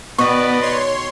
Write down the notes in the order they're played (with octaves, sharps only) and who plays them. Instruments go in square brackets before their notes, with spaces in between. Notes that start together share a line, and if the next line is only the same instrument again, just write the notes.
[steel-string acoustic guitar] B2 D#3 [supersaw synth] B3 [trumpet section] B4 D5 D#5 [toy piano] C#6
[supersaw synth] C#5 C6